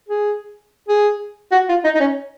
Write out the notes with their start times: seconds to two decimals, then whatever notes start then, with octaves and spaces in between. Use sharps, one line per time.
0.09 G#4
0.89 G#4
1.52 F#4
1.69 F4
1.84 D#4
1.95 D#4
2.00 C#4